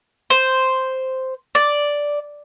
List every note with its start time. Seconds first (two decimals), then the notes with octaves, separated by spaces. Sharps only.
0.30 C5
1.55 D5